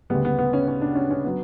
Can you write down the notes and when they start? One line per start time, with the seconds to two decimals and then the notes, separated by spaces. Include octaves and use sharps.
0.10 D2 C#3 G3 B3
0.25 B3
0.38 B3
0.53 C#4
0.68 C#4
0.81 D4
0.95 C#4
1.11 C#4
1.25 F#3 B3